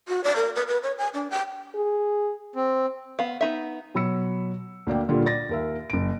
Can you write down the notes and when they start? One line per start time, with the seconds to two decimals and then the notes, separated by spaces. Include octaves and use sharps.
0.08 F#4
0.24 D5
0.36 A#4
0.55 B4
0.67 B4
0.83 C#5
0.98 G#5
1.14 D4
1.31 G5
1.75 G#4
2.56 C4
3.19 B3 F5
3.41 B3 D#4 E5
3.94 B2 F#3 B5 E6 C#7
4.87 D2 A#3 D5 G5
5.08 A#2 D3 G3 F4
5.26 D5 A6 A#6
5.49 D#2 A#4 E5
5.90 F#1 D7